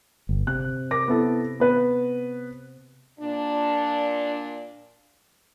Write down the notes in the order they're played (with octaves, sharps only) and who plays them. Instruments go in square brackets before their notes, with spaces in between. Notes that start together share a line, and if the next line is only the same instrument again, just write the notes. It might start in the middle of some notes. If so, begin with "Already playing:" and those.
[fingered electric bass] G1
[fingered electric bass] C3 [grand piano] F#6
[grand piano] A#4 D6 A#6
B3 E4 A4
B3 B4
[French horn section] A#2 D4